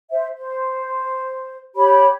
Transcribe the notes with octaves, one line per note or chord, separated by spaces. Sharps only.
C5 E5
C5
G4 C#5 B5